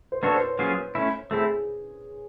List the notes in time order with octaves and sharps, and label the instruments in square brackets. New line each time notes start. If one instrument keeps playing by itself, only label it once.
[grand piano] C5
[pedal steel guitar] A#3 D4 F#4 A4 C#5 [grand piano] B4
[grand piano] C5
C#5
[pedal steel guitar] F#3 A#3 C#4 F4 G#4
A3 C#4 E4
[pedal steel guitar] A3 C4 E4 [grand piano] G#4